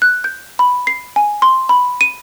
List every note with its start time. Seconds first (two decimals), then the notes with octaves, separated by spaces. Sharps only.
0.02 F#6
0.24 G6
0.59 B5
0.87 C7
1.16 G#5
1.42 C6
1.69 B5
2.01 D#7